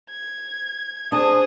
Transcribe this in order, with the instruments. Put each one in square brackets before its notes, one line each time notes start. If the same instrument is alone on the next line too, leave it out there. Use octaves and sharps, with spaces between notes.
[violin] G#6
[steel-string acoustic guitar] D4 A5 [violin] G#4 C5 [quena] D#6